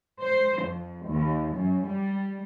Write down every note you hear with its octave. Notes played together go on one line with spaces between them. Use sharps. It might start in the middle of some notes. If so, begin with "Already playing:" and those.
C5
F2
D#2
F#2
G3